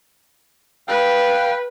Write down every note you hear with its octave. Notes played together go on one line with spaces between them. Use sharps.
B4 F5 G5